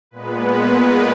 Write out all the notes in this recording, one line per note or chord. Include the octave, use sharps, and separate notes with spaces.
A#2 G#3 B3 B4
B4
A#4